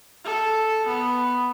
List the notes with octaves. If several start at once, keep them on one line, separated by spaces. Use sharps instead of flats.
A4
B3